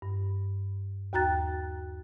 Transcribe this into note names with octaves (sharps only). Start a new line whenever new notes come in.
G2
D#2 F#4 G5 A#5 F#6 A6